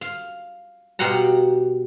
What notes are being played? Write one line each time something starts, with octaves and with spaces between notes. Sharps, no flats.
F5
B2 G4 F5 F#5 A#5